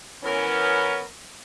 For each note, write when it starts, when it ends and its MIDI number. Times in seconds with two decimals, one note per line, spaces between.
0.24 1.05 52
0.24 1.01 59
0.24 1.01 61
0.24 1.05 70